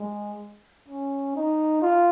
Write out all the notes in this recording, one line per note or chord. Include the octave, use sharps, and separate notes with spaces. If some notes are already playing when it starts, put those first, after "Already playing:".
Already playing: G#3
C#4
D#4
F4